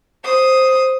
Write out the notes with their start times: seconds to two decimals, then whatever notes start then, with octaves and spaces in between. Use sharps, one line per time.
0.24 C5 D#6